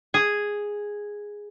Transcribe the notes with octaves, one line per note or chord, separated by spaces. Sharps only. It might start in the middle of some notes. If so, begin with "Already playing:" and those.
G#4